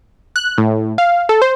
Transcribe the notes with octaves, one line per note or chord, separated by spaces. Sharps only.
F#6
A2
F5
A4
C5